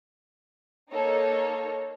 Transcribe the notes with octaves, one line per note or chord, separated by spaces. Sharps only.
A#3 D#4 A4 C#5